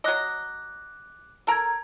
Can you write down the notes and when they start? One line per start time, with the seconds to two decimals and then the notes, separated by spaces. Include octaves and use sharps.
0.04 F#3 D#5 D6 F#6
1.47 A4 A#4 A#5 G#6